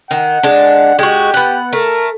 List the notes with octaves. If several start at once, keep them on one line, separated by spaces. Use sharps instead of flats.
D#3 F#5
G#3 D4
G#3 F#4 G4
B3 F#5
A3 A#4